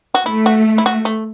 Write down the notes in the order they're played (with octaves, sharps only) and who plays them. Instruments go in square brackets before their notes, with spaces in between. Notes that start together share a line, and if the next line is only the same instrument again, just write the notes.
[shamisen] F#4
[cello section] A3 [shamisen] E4
[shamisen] F#4
E4
F#4
A3